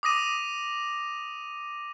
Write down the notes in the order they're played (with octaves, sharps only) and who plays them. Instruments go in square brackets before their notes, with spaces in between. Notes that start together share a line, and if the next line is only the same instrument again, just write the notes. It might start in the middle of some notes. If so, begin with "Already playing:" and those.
[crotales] D6 D#6 A#6 D#7